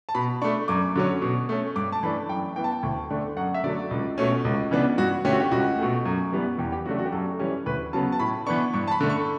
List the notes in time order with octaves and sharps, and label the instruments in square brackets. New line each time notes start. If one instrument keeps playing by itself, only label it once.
[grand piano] A5
B2 B5
A3 D4 C#6
F#2 D6
D3 F#3 C#4
B2
A3 C#4
G2 D6
A5
E3 A3 D4 B5
F#2 G5
E3 B3 G5
A5
G5
D2
D3 A3 D4
F#2 F#5
E5
D3 F#3 A3 D5
C#2
B2 A3 C#4
C#2
C#3 E3 B3 D4
G2 F#4
D3 A3 C#4 G4
F#4
G4
C#2 F#4
B2 A3
F#2
E3 G3 B3
E2 G4
G4
C#3 F#3 A3 D4 F#4
F#4
G4
F#2 A4
E3 G3 C#4
D2 B4
C#3 F#3 B3 A5
A5
A2 B5
E3 B3 D4 C#6
G2 C#6
A5
B5
D3 A3
C#6